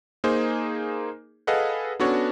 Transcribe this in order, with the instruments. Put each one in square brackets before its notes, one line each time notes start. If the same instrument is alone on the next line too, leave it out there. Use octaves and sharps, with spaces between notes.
[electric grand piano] A#3 D#4 G#4 C5
G#4 A4 B4 D#5 F5 F#5
B3 C#4 D4 F#4 A4 C#5